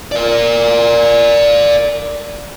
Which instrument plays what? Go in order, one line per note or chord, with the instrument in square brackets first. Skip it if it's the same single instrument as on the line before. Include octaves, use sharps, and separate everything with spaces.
[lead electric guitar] A#4 D5